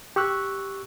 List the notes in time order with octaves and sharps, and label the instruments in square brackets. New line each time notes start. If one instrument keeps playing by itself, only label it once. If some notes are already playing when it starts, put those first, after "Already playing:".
[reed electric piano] G4 C#6 E6 F#6